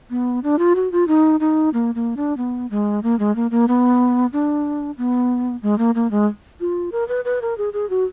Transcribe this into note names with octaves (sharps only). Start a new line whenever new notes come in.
B3
D4
F4
F#4
F4
D#4
D#4
A#3
A#3
D4
B3
G#3
A#3
G#3
A#3
A#3
B3
D4
B3
G#3
A#3
A#3
G#3
F4
A#4
B4
B4
A#4
G#4
G#4
F#4